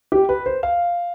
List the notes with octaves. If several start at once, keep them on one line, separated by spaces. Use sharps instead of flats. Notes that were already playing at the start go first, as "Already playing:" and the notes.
G4
B4
C5
F5